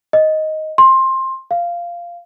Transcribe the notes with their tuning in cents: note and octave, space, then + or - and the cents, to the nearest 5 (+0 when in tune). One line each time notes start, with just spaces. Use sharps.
D#5 +5
C6 +15
F5 -10